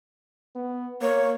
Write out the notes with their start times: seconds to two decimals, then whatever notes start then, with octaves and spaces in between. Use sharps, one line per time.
0.56 B3
1.02 A#3 C#5